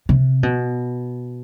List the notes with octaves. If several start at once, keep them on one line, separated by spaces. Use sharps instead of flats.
C3
B2